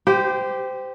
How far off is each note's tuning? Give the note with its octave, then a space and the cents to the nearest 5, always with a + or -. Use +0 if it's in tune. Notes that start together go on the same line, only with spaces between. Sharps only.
G4 +0 C5 -25